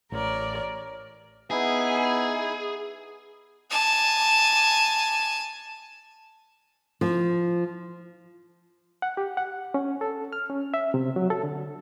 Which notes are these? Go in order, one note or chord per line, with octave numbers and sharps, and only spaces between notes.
A1 A#4 C#5 D5
B3 D#4 E4 G#4
G#5 A5
F3
F#5
G4
F#5
C#4
A4
F6
C#4
E5
C3
F#3
A4
D3